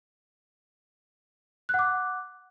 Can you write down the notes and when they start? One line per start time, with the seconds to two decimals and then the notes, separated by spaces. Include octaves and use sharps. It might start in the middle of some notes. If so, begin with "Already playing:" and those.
1.69 F#6
1.74 F#5
1.79 D6